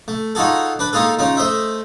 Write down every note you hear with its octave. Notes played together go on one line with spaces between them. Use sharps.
A3
D#4 F4 F#4 G#4 A4
D4 B4
A#3 D#4 F4 G#4 A4
C#3 D#4 F4
A3 C5 D#5 E5